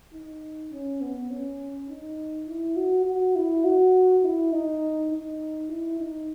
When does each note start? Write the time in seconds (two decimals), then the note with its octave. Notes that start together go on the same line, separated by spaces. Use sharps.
0.13 D#4
0.72 C#4
1.01 B3
1.31 C#4
1.89 D#4
2.48 E4
2.76 F#4
3.06 F#4
3.36 E4
3.65 F#4
4.23 E4
4.52 D#4
5.11 D#4
5.70 E4
5.99 D#4